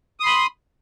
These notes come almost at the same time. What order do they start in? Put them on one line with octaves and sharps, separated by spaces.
D#6 C6 B5